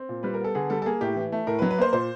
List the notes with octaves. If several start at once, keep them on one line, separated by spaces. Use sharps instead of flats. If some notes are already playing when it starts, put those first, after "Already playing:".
Already playing: C4
A#2
G3 B4
A#4
B3 A4
D3 G#4
G3 A4
A4
A#3 G#4
A2 G4
E3
A3
A2 A#4
B4
F#3
B4
A#3 C5
A#2 C5